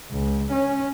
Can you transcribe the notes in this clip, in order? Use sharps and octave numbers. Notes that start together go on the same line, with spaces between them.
C#2
C#4